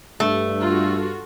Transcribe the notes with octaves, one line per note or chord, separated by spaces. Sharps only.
G2 A3
F4 F#4